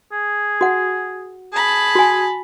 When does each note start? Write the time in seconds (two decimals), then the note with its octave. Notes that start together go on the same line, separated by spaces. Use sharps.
0.12 G#4
0.61 F#4 F#5
1.53 G#4 A5 B5
1.95 F#4 G#5